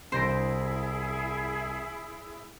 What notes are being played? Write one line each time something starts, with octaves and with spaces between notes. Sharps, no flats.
C2 E4 G#4 C5 C6 A#6 D7